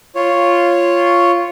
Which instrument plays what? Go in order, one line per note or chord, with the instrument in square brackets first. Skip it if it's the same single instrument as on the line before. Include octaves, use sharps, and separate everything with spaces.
[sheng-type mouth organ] F4 C#5